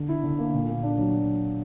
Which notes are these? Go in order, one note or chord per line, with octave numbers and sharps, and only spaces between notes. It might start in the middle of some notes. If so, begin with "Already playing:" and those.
Already playing: D3
E4
D3
A#3
A#2
A#3
D4
F#3